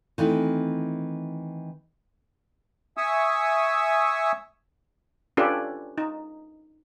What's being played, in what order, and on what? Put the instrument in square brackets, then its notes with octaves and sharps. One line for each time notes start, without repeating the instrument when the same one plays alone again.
[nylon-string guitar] D#3 E3 A3 C4
[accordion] E5 G#5 C#6 D#6 E6
[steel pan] C#4 D4 F4 G4 A4 B4
D#4